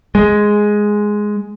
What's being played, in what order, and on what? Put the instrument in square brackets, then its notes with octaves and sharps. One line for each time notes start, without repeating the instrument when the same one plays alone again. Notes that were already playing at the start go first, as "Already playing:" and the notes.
[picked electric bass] G#3